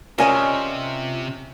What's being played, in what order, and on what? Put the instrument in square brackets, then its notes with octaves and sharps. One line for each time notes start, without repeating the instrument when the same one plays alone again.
[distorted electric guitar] C3 [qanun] C#4 [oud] F4 D5 D#5 [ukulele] A#4 G#5